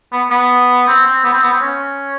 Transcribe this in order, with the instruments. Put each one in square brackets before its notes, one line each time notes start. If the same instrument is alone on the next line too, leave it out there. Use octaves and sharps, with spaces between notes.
[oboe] B3
B3
C4
C4
B3
C4
B3
C4
C#4